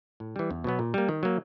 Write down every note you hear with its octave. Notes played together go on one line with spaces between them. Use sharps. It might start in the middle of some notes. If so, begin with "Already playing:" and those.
A2
E3 G3
E2
B2 F#3 B3
A#2
G3 A#3
D#3
F#3 A#3